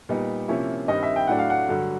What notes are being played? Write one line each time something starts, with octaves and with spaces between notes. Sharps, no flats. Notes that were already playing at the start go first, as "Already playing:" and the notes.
A#2 G3 B3 D#4
C3 F3 A#3 C#4 E4
G2 D#3 G3 C4 D#5
E5
G5
A2 F#3 A3 D4 F#5
F5
F#5
G2 D3 F#3